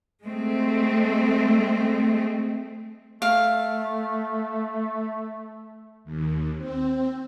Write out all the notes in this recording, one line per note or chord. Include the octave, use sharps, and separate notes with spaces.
G#3 A3 C4
A3 F5
D#2
C4